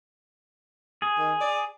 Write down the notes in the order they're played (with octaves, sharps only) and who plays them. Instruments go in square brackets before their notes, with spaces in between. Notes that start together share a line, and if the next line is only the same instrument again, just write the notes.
[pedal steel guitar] G#4
[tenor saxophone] D#3
D5